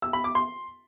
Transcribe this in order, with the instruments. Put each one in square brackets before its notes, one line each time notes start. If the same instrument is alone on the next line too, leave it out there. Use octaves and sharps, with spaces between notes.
[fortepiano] E6
B5
D6
C6